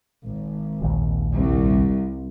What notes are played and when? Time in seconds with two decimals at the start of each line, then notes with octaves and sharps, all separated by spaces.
0.25 G#1
0.81 F1 A#1 D#2
1.32 C2